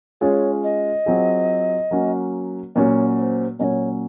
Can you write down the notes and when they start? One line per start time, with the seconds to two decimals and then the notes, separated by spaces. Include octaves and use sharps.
0.21 G#3 C#4 F4 G#4 C#5
0.64 D#5
1.06 F#3 C4 F4 G#4
1.91 F#3 A#3 C#4 F#4
2.75 A#2 F#3 C#4 F#4 C#5 D#5
3.18 C#5
3.22 C5
3.59 A#2 F#3 C#4 C#5 D#5